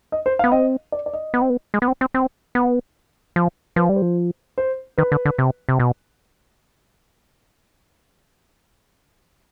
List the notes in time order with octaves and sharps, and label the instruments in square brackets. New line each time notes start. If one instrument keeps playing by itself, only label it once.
[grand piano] D#5
C5
F5
[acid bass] B3
[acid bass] C4 [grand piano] D#5
[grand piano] D5
D5
D#5
[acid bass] B3
C4
B3
G#3
B3
C4
C4
C4
B3
F3
[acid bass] F3 [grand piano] B4
[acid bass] G3
[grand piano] C5
[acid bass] F3
[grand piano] C5
[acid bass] D#3 [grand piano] B4
[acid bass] D3
D3
C3
C3
B2